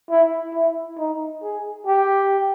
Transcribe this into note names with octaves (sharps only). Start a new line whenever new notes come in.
E4
E4
D#4
G#4
G4